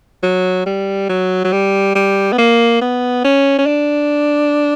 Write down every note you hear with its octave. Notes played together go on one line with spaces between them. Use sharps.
F#3
G3
F#3
F#3
G3
G3
B3
A#3
B3
C#4
C#4
D4